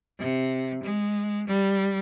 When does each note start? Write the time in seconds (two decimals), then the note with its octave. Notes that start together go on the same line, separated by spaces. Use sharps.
0.19 C3
0.83 G#3
1.47 G3